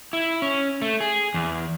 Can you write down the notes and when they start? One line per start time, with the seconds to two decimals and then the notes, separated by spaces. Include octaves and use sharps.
0.13 E4
0.42 C#4
0.82 A3
1.01 G#4
1.34 E2